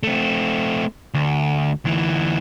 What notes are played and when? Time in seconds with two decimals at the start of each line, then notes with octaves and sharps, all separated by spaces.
0.03 A3 C4
1.14 D2
1.85 D2 E3